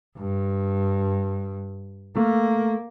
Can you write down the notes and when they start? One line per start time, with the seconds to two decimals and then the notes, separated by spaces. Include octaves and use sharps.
0.18 G2
2.17 A3 A#3